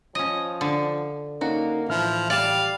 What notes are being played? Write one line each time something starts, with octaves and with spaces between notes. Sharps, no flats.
F3 C#4 D#5
D3
A#3 C#4 D#4 F#4
A2 E3 F3 E4 F6
G3 D5 F5 A5